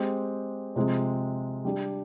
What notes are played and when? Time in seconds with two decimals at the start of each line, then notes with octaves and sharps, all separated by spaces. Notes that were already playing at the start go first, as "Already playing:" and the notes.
Already playing: G#3 C4 G4
0.76 C3 F3 G#3 C4
1.65 G3 D4 G4